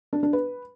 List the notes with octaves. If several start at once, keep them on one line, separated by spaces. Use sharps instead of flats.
D4
D4
B4